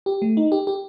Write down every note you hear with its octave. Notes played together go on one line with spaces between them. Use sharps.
G4
A3
D#4
G4
G4